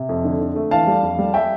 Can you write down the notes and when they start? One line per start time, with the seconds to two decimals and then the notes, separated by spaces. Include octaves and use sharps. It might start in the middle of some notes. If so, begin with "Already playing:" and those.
Already playing: C3
0.09 F2
0.24 D3
0.40 D3
0.56 A3
0.71 E3 F5 A5
0.87 G3
1.03 F2
1.19 G3
1.34 E5 G5